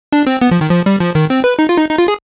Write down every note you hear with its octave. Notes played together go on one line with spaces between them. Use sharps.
D4
C4
B3
F3
D#3
F3
G3
F3
D#3
C4
B4
D#4
F4
D#4
D#4
F4
G#4